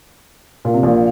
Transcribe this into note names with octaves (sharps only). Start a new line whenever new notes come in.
A#2
C3
A#1 A#2